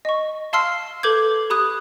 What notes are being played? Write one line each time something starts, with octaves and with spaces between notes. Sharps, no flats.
D#5 C#6
F5 A5 C6 E6 F6 C7
A4 B4 D6 G6 G#6
G4 B5 D#6 F#6